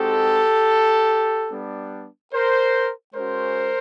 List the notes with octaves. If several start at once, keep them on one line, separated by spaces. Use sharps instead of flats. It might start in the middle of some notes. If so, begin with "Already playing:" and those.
Already playing: G#3 C4 D#4 F#4 G4 A4
G3 B3 D4
A#4 C5
G#3 C#4 F#4 A#4 C5